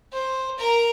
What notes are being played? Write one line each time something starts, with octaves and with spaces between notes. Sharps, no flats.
C5
A#4 A#5